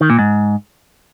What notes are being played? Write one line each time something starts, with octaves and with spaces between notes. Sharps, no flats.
D#3
A#2
G#2